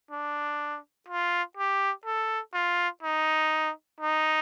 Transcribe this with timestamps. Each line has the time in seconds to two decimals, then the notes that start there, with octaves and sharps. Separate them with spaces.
0.11 D4
1.08 F4
1.57 G4
2.06 A4
2.54 F4
3.03 D#4
4.01 D#4